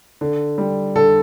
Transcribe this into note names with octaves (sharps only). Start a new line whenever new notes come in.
D3
G3
D3 A4